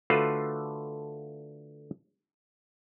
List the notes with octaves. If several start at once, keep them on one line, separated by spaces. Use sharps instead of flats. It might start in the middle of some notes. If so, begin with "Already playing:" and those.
D3 A3 F4 F#4 B4 C5